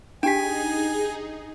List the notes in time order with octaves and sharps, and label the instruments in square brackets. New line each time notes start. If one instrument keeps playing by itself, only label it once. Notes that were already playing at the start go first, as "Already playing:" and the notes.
[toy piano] D4 G4 [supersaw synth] D#4 G#4 [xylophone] G5 B6 [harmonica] G#5